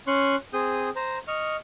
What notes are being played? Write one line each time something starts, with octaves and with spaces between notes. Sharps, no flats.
C#4 C6 C#6 F#6
C4 G#4 D#6 G6
C5 A#5
D#5 C#6 F6